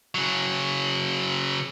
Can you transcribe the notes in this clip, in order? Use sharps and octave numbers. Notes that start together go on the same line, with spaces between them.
C#3 F#3